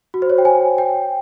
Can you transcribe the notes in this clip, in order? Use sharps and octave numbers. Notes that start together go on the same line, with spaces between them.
F#4
C5
C#5
G5
G#5
G5